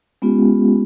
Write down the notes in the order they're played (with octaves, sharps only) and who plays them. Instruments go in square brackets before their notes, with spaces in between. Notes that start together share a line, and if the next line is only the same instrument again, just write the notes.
[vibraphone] G#3 B3 C#4 F4 G4